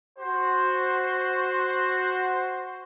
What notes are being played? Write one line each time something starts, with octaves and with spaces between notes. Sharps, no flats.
F#4 C5